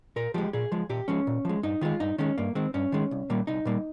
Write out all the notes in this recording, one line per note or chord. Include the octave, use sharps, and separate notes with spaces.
A#2 A#4
F3 G#3 G4
A#2 G#4
F3 G#3
A#2 G4
F3 G#3 C#4
A#2
F3 G#3
G2 D#4
D#3 G#3 F4
G2 D#4
D#3 G#3 C#4
G2 A#3
D#3 G#3 C4
G2 C#4
D#3 G#3
C2
A#2 G3 A#3
C2 D#4
A#2 G3 A#3